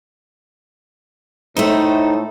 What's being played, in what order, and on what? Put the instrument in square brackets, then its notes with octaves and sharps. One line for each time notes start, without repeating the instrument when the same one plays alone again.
[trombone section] A2 [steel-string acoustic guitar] A3 A4 C5 [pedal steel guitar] D#4